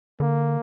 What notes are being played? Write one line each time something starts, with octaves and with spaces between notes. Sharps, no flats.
D3 A#3